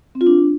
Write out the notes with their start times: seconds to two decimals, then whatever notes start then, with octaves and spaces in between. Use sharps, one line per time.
0.15 C4
0.21 F4
0.27 D4